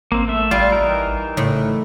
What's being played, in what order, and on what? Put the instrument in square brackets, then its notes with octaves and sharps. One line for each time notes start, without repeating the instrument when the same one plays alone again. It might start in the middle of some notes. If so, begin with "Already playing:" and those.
[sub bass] A1 [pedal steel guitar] A#3 C4
[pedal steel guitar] A3 E5
[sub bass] A1 [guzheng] G3 [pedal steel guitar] F4
[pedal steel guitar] E3 D#4 A#4
[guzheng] A2 [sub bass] C#3